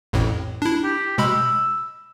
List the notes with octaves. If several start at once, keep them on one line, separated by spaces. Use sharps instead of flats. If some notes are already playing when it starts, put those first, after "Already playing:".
A1 F2 A2
D4 E4
G4
B2 G#3 B5 E6